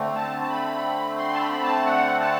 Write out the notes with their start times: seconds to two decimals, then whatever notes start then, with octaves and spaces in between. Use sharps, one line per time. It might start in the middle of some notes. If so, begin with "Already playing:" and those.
Already playing: D3 A3 C4
0.16 A5
0.42 A5
0.50 B5
1.18 C6
1.34 A5
1.40 B5
1.53 B5
1.63 A5
1.86 F#5
2.20 A5